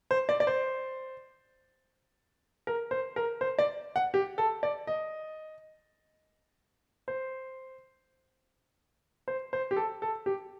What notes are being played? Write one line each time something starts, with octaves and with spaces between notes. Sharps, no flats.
C5
D5
D5
C5
A#4
C5
A#4
C5
D5
F#5
G4
A4
D5
D#5
C5
C5
C5
G4
A4
A4
G4